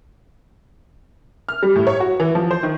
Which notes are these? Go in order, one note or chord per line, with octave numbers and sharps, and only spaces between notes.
F6
G3
A2
C#5
F#4
E3
F3
C5
D#3